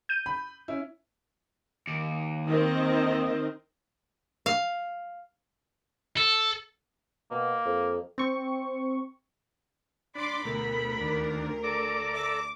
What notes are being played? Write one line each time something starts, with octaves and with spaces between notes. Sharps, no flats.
G6 D#7
B5
C#4 E4
D#2
D#3 C4 D#5
F5
A4
B2 A#3
F2
C4 C#6
D4 D5 B5 C6 D6
D2 B2 A3 A#4
D#2 D4
A4 D5 A#5 D6
E5 D6